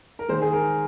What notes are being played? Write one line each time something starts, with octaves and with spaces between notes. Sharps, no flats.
A#4
D#3 G#3 C5
G#4
A#4